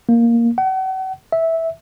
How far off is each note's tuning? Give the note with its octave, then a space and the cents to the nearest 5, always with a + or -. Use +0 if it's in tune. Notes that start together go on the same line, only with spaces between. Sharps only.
A#3 +0
F#5 +40
E5 -10